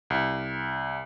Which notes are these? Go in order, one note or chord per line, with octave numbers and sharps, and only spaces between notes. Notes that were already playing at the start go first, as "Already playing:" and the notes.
C2